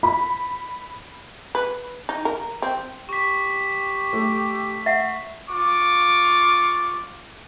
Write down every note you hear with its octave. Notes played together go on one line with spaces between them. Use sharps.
B5
B4
D#4
A#4
C4
G4 C#6 B6
A3
E5 F#5
F4 C#6 D6